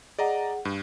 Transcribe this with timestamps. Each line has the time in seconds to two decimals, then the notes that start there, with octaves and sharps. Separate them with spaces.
0.19 G#4 D5 D#5 F#5 A#5
0.65 G2